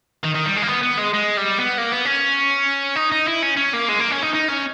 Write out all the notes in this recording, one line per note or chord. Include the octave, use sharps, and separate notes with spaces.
D#3
D#3
G3
G#3
A#3
B3
B3
G#3
G#3
G3
B3
A#3
B3
C#4
D#4
D#4
E4
C#4
C#4
A#3
G#3
A#3
C#4
D#4
D#4
C#4